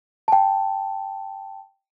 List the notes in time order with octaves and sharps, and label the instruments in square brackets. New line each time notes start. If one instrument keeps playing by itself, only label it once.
[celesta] G5 A5